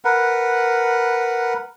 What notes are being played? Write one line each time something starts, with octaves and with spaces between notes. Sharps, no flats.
A#4 B4 F#5